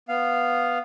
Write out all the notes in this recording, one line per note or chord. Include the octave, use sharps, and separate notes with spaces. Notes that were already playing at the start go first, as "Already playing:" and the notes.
B3 F5